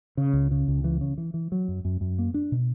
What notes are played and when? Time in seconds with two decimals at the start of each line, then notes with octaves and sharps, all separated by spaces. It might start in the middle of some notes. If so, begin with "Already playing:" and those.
0.17 C#3
0.33 C#2
0.51 C#3
0.68 C#2
0.84 E3
1.01 C#3
1.18 E3
1.34 E3
1.52 F#3
1.68 F#2
1.85 F#2
2.01 F#2
2.19 A#3
2.34 D4
2.52 B2